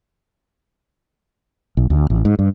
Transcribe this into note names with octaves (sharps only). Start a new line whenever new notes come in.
B1
D2
A1
G#2
G2